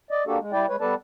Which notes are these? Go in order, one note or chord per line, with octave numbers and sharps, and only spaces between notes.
D5 D#5
A#3 D4 F#4 G4 A4
G#3
G3 E4 D5 G5
G#3 B4 C#5
G3 B3 A4 B4 D5 A5